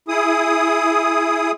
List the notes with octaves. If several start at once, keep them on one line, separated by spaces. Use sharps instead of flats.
E4 G#4 D#6